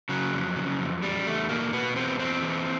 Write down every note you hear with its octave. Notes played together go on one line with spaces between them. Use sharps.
C#3 F#3
F2
C#3
F2
E2 G3
E2 A3
B2 A#3
B2 B3
E2 C4
E2 C4
E3